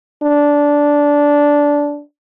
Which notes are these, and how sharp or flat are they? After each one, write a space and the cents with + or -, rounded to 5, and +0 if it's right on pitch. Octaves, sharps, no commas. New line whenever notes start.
D4 -10